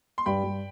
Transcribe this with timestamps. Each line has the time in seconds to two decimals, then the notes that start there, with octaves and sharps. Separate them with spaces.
0.18 C6
0.26 G2 G5 B5
0.44 G2